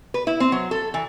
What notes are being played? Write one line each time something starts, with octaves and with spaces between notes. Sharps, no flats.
B4
E4
C4
F#3
A4
E3